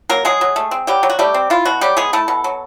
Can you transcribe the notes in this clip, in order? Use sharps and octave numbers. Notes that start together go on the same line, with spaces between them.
F#3 A#3 A#4
F#3 G#3 G#4
F#3
A3
C4
F#3 G3 G4
F#3
F#4
G3 A3 G4
C4
E4 F4
B2 F#4
F#3 G3 G4
G#3 B3 G#4
A3 E4 A4
B2
F#3